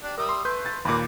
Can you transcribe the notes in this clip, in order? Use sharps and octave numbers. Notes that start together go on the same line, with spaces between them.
D4 G4
G3 A#4 E5 D#6
C6
A3 B4 C6 G6
A6
D#2 A#2 A#3 B4 B5 D6